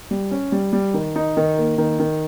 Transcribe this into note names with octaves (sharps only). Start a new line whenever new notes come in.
G3
C#4
G3
G3
D#3
D#4
D#3
A#3
D#3
D#3